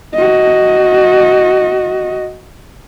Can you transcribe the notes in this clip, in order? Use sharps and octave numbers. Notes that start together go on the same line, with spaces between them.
F#4 D#5